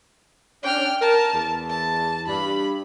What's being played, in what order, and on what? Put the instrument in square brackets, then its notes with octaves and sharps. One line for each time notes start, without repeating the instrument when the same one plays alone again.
[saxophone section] C#4 D4 [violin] G5 F6
[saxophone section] A#4 [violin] A5
[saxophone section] E2
[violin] A5
[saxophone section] G2 [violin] B5